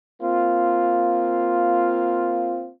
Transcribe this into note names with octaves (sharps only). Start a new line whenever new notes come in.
A#3 C4 F4